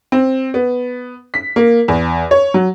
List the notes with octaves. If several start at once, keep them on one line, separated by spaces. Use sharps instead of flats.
C4
B3
B6
A#3
E2
C#5
F#3